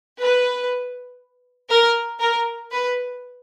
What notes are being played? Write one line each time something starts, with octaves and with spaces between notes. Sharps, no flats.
B4
A#4
A#4
B4